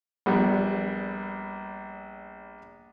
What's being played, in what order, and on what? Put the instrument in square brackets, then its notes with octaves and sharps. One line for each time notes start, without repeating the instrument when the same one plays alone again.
[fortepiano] A#1 G3 B3